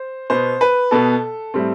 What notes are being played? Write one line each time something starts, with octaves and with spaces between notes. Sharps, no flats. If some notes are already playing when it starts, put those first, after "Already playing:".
Already playing: C5
B2 B3 C5
B4
B2 B3 A4
A2 G3 C4